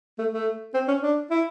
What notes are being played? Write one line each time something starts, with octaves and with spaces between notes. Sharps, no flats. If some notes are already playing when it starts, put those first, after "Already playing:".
A3
A3
C4
C#4
D4
E4